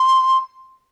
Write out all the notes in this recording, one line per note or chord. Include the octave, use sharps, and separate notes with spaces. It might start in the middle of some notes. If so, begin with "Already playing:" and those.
Already playing: C6